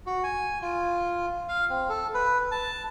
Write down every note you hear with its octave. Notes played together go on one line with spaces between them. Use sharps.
F#4
G#5
F4
F5
C4
A4
B4
A5